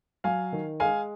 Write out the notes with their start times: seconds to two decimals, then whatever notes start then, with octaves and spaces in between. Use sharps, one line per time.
0.24 F#3 F5 G#5
0.53 D#3
0.80 G#3 F5 G#5